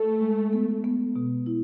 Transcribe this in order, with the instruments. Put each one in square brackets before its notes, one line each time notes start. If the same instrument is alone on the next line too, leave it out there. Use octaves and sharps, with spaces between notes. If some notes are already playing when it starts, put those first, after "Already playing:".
Already playing: [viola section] A3
[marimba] G#3
B3
B3
B2
E4